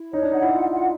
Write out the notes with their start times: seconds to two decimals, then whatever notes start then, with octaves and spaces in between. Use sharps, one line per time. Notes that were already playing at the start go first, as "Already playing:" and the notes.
Already playing: E4
0.12 D#4 C#5
0.22 D4
0.32 D#4 F#5
0.42 E4
0.51 F4
0.70 F#5